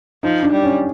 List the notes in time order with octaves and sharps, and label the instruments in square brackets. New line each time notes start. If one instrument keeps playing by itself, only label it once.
[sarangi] F3 [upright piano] D#4
[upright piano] D4
[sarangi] G3
[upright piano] C#4